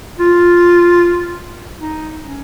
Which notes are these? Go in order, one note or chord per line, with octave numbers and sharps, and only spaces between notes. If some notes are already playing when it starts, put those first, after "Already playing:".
F4
D#4
C#4